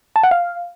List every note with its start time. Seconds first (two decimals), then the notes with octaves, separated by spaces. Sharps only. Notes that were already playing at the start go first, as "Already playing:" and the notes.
0.16 A5
0.23 F#5
0.31 F5